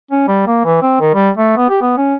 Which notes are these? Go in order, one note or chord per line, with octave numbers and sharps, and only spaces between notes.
C#4
G3
A#3
E3
C4
D#3
G3
A3
B3
G4
B3
C#4